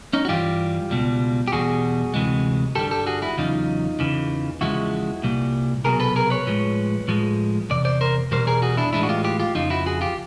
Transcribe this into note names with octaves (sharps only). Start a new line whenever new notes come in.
C#4 D#4
F#4
G2 E3 G3 F4 G4
C#2 B2 G3
G4
E2 B2 G3 F#4 G#4
D2 C3 E3 G#3
G2 D3 G3 G4 A4
G4 A4
F#4 G#4
E4 F#4
E2 C#3 F#3 D#4 F4
E2 C#3 E3
E2 C#3 F3 G#3 E4 F#4
C2 A#2 G3
C2 B2 F#3 G#4 A#4
A4 B4
G#4 A#4
B4 C#5
A2 F3 G#3
A2 F3 G#3
E2 C3 D5
C5 D5
A#4 C5
E2 B2 G3 A#4 C5
G#4 A#4
F#4 G#4
D4 E4
A2 E3 G#3 D4 E4
F#4
F4 G4
F4 G4
F4 G4
F2 C#3 F3 D#4 F4
E4 F#4
F#4 G#4
F4 G4